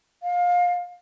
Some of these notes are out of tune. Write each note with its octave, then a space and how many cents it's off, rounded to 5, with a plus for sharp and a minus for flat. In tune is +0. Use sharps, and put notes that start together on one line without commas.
F5 +25